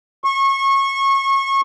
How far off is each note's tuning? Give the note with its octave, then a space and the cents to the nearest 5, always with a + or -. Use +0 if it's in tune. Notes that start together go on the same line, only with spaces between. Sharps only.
C#6 -25